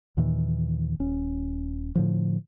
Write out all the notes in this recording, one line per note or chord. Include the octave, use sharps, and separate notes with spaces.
D#2 A#2 D#3 E3
D#1 C#4
A2 D3 F3